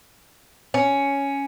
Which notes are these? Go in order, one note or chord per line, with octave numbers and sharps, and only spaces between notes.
C#4